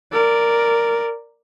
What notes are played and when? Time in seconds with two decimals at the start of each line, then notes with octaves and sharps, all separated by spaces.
0.12 A#4 D5